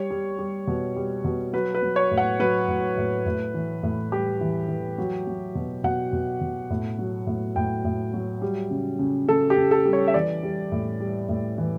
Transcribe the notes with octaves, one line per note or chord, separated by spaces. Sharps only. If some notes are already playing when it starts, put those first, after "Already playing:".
Already playing: G3 C#5
G3
G3
B2
G3
B2
F#3 B4
B4
F#3
C#5
A2
F#5
F#3 B4
A2
A2
A2
E3
A2
G3 G4
E3
E3
F#3
F#3
B2
B2 F#5
B2
B2
A2
F#3
A2
A2 G5
A2
F#3
G3
C#3
C#3
C#3 A4
G4
C#3
A4
G3
C#5
E5
E3 D5
G3
A2
G3
A2
E3